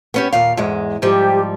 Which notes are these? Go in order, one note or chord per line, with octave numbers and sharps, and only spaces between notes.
B3 C#4 G4
D#2 A#2 F5
E2 G#2 G#3
G#2 F3 G3 G4